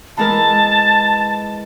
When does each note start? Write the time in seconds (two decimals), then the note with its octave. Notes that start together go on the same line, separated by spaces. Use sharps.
0.17 E3 G#3 A#4 A5